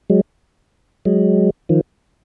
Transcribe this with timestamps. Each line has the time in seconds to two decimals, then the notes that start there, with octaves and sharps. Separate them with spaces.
0.10 F#3 G#3
1.05 F#3 G#3
1.69 D#3 F3